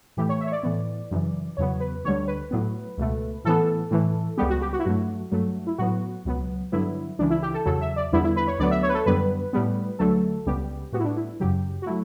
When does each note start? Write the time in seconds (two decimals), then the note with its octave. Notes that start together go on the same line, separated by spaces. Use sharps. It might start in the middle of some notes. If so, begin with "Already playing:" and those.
0.17 A2 E3 A3 G4
0.29 C#5
0.41 E5
0.47 C#5
0.52 D5
0.63 A2 E3 B3
1.11 F#2 C#3 E3
1.57 E2 C#3 F#3 B3 C#5
1.80 B4
2.04 D2 D3 G3 C#5
2.28 B4
2.51 A2 F#3 B3
2.98 C#2 B2 A3
3.44 A2 E3 B3 A4
3.91 A2 E3 A3
4.38 C#2 C#3 G3 B3 G4
4.50 F#4
4.62 G4
4.73 F#4
4.79 E4
4.85 G2 F#3 A3 F#4
5.32 G2 F#3 A3
5.67 E4
5.78 A2 F#3 B3 F#4
6.25 C#2 B2 F#3 B3
6.72 G2 D3 F#3 B3 E4
7.19 C#2 C#3 E3 D4
7.30 E4
7.42 G4
7.54 A4
7.65 E2 C#3 F#3 A4
7.81 E5
7.96 D5
8.12 E2 D3 G3 B3 E4
8.24 E4
8.36 B4
8.47 C#5
8.59 D2 D3 F#3 B3 D5
8.71 E5
8.83 C#5
8.89 B4
8.94 A4
9.06 F#2 D3 G3 B3 B4
9.53 A2 G3 B3
9.99 D2 D3 F#3 A3 A4
10.46 C#2 C#3 G3 B3 G4
10.92 A2 G3 B3 F#4
11.00 E4
11.05 D4
11.17 E4
11.40 F#2 C#3 F#3 G4
11.82 F#4
11.86 F#3 A3 E4